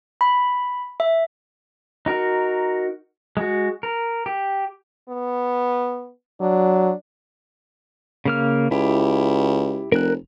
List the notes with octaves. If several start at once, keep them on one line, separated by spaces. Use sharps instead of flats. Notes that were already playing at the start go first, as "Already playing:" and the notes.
B5
E5
D#4 F#4 A#4
G#3 F#4
A#4
G4
B3
F#3 D4
C#3 A#3 F6
C#2 E4 G4
F1 A#4 F#6